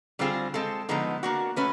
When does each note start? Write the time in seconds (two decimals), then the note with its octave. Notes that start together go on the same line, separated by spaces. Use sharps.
0.19 D3 G3 C4 F4 G#4
0.54 G#3 C4 F4 A4
0.89 D3 F3 G#3 B3 D#4
1.23 A#3 D4 F#4
1.56 A3 C#4 F#4 B4